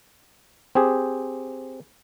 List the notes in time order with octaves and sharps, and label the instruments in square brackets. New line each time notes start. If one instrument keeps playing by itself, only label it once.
[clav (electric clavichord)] C4 G4 G#4